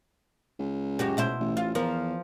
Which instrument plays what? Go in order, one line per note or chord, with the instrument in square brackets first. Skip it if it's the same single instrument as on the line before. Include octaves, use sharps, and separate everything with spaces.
[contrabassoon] C#2
[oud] F#2 F#4 G4
B2 E4 C5
[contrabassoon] A1
[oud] F4
[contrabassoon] E2 [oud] F3 A#4